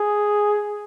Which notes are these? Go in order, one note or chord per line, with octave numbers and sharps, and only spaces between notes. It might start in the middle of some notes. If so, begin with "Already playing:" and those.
Already playing: G#4